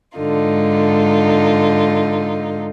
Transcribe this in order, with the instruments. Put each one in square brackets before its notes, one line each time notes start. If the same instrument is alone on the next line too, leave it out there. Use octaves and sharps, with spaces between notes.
[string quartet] G#2 D3 D#4 F4